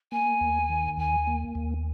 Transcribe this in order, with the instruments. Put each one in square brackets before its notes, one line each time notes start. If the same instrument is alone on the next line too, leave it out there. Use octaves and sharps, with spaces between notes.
[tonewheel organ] A#3 [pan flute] G#5
[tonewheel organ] D#2
D#3
[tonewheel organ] D#2 [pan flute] G#5
[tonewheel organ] A#3
D#2